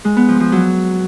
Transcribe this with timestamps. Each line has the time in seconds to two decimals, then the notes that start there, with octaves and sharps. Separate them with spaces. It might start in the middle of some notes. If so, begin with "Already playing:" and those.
0.05 G#3
0.16 B3
0.28 F3
0.40 F3
0.52 F#3